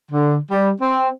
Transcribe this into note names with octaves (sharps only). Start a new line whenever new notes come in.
D3
G3
C4